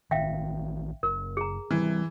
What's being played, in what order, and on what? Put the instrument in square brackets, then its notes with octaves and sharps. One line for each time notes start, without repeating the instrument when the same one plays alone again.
[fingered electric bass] A1 D#3 [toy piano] E5 F5 G5
[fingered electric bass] F#1 [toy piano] A#4
[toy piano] G#4 A#5
[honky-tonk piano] E3 [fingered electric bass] G3 C4